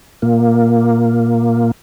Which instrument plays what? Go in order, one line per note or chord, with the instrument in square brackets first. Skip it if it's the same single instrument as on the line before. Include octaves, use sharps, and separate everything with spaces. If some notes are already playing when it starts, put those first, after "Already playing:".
[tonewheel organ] A#2 A#3